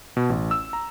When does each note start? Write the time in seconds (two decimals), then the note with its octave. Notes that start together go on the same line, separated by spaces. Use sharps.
0.17 B2
0.30 A1
0.51 E6
0.73 A#5